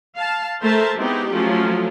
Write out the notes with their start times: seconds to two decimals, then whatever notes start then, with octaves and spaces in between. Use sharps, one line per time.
0.17 F5 A5
0.62 A3 A#4 C5 E5 A5
0.97 G#3 B3 C4 D#4 E4 G4
1.32 F3 F#3 A3 C#4 F4